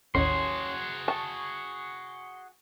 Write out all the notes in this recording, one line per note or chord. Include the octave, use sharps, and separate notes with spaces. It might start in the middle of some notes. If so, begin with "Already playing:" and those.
A1 D#2 C#4 F#4 G#4 C6
A5 C#6